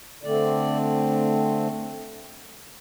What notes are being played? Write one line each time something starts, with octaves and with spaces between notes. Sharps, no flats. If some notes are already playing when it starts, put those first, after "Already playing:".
D3 A3 C4 D5